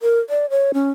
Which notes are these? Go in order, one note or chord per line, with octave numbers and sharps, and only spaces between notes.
A#4
D5
C#5
C#4